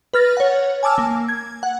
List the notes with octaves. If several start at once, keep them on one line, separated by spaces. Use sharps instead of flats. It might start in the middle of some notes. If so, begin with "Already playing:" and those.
B4 F6 A6 A#6
C#5 F#5
G#5 A5 D6 E6 F6
A#3
G#6
F#5